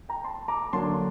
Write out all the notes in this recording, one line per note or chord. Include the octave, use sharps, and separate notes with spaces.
G5 A#5
A5 C6
A#5 D6
D3 F#3 A#3 D4 A5 C6